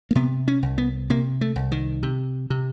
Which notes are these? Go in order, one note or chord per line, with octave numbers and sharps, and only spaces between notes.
A#3
C3 B3
C#4
C2
B3
C3 A#3
A3
C2
D#3
C3
C3